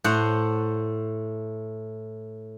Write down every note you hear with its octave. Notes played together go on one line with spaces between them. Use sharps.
A2 C5 F#5